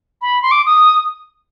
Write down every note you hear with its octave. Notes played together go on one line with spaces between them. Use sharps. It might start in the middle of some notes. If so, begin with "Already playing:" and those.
B5
C6
D6
D#6